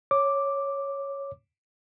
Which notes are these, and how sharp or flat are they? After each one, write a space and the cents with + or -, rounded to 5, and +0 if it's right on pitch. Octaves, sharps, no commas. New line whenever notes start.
C#5 +0 D6 +0